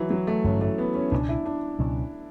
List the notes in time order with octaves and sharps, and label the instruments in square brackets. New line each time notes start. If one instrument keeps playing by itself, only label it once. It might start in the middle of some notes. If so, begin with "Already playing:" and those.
Already playing: [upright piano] E3 F#3
F#3
A3
[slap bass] A1 G2 D3 G3 [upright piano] C#4
[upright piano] A3
B3
C#4
[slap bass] C#2 B2 F#3 C#4 [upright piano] D4
[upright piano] E4
D4
[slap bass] C#2 B2 F#3 C#4